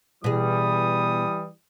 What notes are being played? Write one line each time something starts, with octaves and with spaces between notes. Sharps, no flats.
B2 E3 G3 G#4 D#6